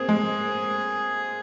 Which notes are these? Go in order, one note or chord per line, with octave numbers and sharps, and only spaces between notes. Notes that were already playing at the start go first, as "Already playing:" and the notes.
Already playing: A#3 C4 G#4
G#3